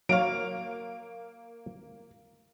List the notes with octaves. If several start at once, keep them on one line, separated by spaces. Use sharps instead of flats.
F#3 A#3 A#4 C#5 F5 D7